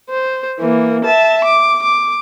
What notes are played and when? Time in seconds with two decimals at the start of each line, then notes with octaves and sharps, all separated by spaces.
0.10 C5
0.59 E3 A#3
1.05 E5 A5
1.45 D6
1.83 D6